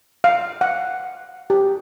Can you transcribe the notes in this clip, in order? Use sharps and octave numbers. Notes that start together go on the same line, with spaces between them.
F5
F#5
G4